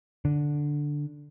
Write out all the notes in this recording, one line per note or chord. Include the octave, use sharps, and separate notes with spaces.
D3